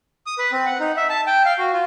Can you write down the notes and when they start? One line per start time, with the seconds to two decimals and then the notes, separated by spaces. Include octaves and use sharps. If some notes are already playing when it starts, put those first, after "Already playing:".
0.26 D#6
0.38 B4
0.52 C4
0.66 F#5
0.80 D#4
0.97 E5
1.10 A5
1.27 G5
1.45 F5
1.59 F#4
1.73 F4